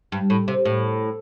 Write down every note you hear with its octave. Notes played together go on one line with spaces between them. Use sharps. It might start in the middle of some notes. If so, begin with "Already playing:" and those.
G2
A2
C3
A2